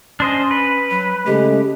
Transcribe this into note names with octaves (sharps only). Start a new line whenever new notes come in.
C#4 D4 C5 D#5
B4
F#3
C#3 G#3 A3 G4